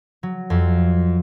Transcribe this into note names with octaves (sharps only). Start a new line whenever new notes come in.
F#3
F2